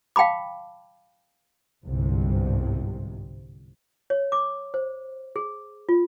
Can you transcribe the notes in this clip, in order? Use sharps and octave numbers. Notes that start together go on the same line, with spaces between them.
F5 G5 A5 B5 D6
G1 C2 G#2 C3
C#5
D6
C5
G#4
F4